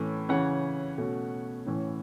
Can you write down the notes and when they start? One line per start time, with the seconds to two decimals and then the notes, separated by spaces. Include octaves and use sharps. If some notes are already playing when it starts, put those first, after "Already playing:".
Already playing: A2 E3 A3 C#4
0.29 C#3 E3 C#4 F#5
0.98 B2 A3 C#4
1.66 A2 E3 C#4